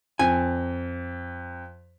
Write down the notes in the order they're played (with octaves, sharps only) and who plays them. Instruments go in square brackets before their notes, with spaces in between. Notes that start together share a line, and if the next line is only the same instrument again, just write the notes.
[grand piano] F2 [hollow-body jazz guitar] G#5